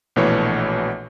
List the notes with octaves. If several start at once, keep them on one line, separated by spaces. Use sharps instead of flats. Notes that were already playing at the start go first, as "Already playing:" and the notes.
A#1 B2 E3 A3 C#5